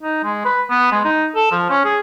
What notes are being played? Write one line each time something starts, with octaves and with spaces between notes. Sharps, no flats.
D#4
G#3
B4
B3
G#3
D#4
A4
F3
C#4
G#4